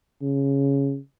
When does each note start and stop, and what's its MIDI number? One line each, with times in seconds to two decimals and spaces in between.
0.22 0.98 49